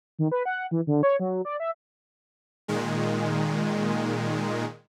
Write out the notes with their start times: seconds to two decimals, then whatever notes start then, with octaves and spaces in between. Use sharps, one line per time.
0.19 D#3
0.31 B4
0.46 F#5
0.71 E3
0.87 D3
1.03 C#5
1.20 F#3
1.45 D5
1.60 E5
2.68 A#2 D#3 G#3